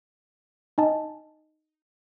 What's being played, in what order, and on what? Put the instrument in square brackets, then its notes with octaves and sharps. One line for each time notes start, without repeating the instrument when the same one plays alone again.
[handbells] D#4 D#5 G#5 A5